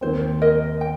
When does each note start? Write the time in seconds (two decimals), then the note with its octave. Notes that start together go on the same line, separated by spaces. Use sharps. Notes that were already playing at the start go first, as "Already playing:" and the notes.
0.01 D#2 D#3 C4 C5
0.41 A#4 D#5
0.81 G5